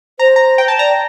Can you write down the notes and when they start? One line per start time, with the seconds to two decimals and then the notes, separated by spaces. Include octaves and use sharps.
0.19 C5 A#5
0.36 A#5
0.58 G5
0.68 A5
0.79 D5 A#5